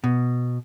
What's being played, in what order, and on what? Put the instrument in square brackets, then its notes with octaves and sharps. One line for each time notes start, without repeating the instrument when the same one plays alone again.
[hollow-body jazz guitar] B2